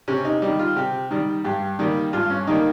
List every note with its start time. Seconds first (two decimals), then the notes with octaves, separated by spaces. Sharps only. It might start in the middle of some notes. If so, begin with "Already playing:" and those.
0.08 C3 C#4
0.25 D#4
0.42 D#3 G3 D#4
0.59 F4
0.76 C3 G4
1.11 D#3 G3
1.44 G2 G4
1.79 D#3 G3 A#3
2.13 G2 F4
2.30 C#4
2.47 D#3 G3 A#3 D#4